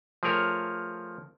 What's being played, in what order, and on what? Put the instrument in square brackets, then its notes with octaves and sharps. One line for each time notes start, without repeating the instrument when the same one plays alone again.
[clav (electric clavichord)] F3 A3 G#4 A#4 C#5